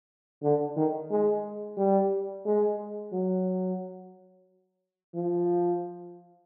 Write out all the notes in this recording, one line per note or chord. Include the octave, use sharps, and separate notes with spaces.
D3
D#3
G#3
G3
G#3
F#3
F3